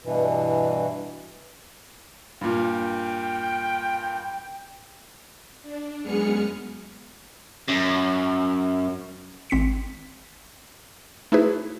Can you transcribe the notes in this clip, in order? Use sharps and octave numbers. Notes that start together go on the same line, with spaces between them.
G2 B2 E3
G2 A#2 G5
D4
F#2 G#3 B3 G#4 F6 C#7
F#2
G#1 C4 B6 C#7
A3 D#4 E4 F#4 G#4 B4